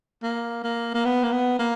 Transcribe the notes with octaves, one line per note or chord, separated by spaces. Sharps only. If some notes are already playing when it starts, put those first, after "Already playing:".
A#3
A#3
A#3
B3
A#3
B3
A#3